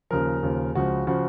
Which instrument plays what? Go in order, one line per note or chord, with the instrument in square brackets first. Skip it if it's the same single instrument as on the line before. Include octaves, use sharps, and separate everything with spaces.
[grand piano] D#2 C#3 F3 A#4
D#2 C#3 F3
C#2 C#3 F3 F#4
C#3 F3 F#4